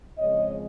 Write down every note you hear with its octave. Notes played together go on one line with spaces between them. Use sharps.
C#3 F3 G#3 C4 C#5 D#5